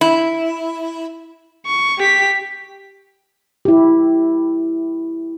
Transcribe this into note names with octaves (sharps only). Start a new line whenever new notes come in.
E4
C#6
G4 B6
E4 G4